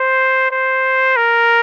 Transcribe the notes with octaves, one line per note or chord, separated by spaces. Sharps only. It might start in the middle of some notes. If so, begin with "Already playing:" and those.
Already playing: C5
C5
A#4